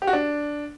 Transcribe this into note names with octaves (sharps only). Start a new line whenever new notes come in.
G4
F#4
D4